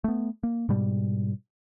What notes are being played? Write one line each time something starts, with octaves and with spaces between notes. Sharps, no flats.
A3 B3
A#3
G#2 B2 G3